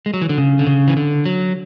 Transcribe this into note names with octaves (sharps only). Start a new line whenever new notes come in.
G#3
F#3
E3
D3
C#3
D3
C#3
E3
D3
F#3